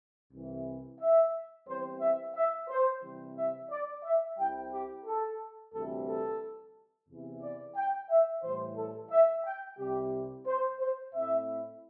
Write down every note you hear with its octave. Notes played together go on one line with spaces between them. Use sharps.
C2 C3 E3
E5
E2 E3 G3 C4 C5
E5
E5
C5
C3 E3 G3 C4
E5
D5
E5
C2 C3 G3 C4 E4 G5
G4
A4
D2 C3 E3 G3 C4 A4
A4
E2 C3 E3
D5
G5
E5
A2 E3 G3 C5
A4
E5
G5
C2 C3 G3 G4
C5
C5
A2 A3 C4 E4 E5